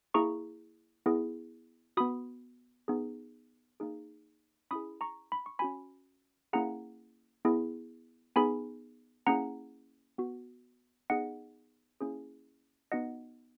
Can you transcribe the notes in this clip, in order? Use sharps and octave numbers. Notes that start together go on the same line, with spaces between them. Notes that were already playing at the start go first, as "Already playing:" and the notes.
A#3 E4 G#4 A#5 C#6
B3 E4 G#4
B3 F#4 B5 D#6
B3 D#4 G#4
A#3 D#4 G#4
C#4 E4 G#4 B5 D#6
A#5 C#6
B5
C#6
C#4 F#4 G#5 B5
A#3 C#4 E4 G#4 F#5 A#5
B3 E4 G#4
B3 D#4 G#4 G#5 B5
A#3 C#4 E4 G#4 F#5 A#5
B3 F#4
B3 D#4 G#4 D#5 F#5
A#3 C#4 E4 G#4
B3 D#4 F#4 D#5 F#5